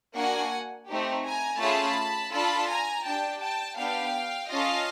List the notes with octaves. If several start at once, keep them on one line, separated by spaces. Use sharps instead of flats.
A#3 D4 F#4 F#5 G#5
A3 C4 D#4 G4
G#5 A#5
A3 C#4 F4 G#4 A5 B5
D4 F4 A4 A5 B5
G#5 A#5
D4 G4 G5 A5
G5 A5
B3 D4 G4 F5 G5
C#4 F4 A4 D#5 F5